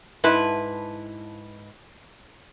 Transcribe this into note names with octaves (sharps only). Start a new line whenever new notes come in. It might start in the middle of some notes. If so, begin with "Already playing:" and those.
G#2 E4 B4 A5